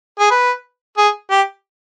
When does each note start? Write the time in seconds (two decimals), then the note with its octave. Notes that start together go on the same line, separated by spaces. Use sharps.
0.19 G#4
0.31 B4
0.98 G#4
1.31 G4